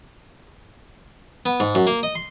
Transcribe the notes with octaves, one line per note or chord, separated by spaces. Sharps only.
B3
G#2
F#2
A#3
D#5
C6